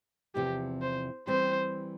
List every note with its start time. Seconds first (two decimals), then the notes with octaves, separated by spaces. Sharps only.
0.35 E2 C3 F3 C4 E4 G4
0.82 C5
1.27 E3 G3 C4 G4 C5